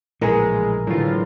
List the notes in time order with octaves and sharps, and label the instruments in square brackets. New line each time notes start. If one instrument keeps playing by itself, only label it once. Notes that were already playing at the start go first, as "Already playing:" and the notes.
[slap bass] A#1 A2 C#3 [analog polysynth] E3 G#3 [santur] G#4 A#4
[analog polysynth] A2 F4 [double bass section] D3 E3 [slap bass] F#3 G#3 D4